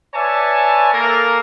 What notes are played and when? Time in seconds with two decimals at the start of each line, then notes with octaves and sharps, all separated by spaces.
0.15 B4 C#5 D5 E5 G#5 A5
0.94 A#3 A4 A#4